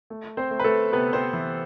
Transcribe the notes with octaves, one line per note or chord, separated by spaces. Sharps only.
A3
C4 C5
A3
B4
A3 A4
C3 B3 B4
C4 C5
E3